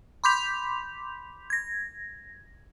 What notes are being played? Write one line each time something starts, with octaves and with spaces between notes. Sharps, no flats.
B5 C6 D6 G6 B6 F7
G#6 A#6